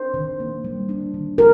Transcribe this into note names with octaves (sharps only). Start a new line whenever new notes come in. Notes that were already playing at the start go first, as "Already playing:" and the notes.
Already playing: D4 C5
D#3
A#3
G3
D4
D#3
A#4